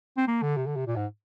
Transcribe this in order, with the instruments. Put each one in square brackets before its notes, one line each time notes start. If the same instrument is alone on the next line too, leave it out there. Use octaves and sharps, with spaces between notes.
[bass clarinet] C4
A#3
D3
C3
D3
C3
A#2
G#2